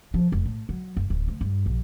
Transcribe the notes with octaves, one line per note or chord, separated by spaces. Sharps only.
F3
F1
A2
F#3
F#1
D1
D2
G2
A#1